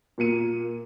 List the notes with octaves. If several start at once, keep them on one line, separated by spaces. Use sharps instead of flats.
A#2 A#3 C#7 D#7